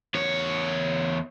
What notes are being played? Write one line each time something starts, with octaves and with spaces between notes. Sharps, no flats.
E2 C#5